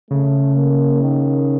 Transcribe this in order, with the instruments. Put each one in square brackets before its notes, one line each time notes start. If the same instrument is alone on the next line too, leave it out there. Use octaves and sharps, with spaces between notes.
[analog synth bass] C#3 [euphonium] A3
[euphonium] A#3
D#3